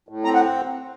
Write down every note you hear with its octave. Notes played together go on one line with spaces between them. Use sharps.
A2
C4 A#5
F#5